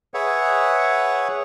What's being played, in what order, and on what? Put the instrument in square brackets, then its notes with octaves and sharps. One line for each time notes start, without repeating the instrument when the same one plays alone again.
[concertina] G#4 B4 C#5 E5 F#5